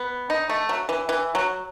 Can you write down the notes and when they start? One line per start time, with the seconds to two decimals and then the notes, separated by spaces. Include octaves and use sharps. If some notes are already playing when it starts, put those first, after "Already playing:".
Already playing: B3
0.30 D#4
0.49 A3
0.69 F#3
0.89 E3
1.09 E3
1.35 F#3